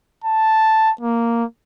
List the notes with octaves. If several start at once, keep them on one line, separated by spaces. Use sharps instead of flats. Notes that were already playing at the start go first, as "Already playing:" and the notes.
A5
A#3